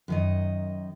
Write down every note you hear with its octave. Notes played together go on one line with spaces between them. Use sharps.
F#2 D#3 D#5